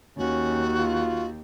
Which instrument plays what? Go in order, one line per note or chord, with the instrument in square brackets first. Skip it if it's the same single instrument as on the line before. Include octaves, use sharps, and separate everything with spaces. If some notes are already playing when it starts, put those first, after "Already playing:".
[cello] D#2 [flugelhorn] C#4 [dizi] F#4
[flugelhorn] F4